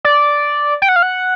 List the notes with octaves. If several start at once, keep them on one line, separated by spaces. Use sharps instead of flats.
D5
G5
F#5
F5
F#5